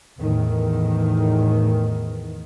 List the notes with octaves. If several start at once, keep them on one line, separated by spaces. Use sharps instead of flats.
E2 A2 D#3